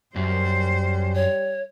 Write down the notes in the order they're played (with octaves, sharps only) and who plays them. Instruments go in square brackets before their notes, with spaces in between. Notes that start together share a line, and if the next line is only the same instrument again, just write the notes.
[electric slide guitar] F#2 [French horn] G3 [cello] C5
[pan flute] C#5